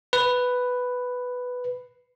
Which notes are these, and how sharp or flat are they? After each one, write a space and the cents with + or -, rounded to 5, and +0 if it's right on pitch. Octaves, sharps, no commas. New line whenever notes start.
B4 +5